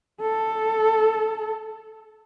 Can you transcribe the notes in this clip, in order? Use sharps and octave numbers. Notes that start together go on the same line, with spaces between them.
A4